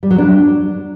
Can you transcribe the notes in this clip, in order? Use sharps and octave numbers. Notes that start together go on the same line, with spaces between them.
G3
F#3
D4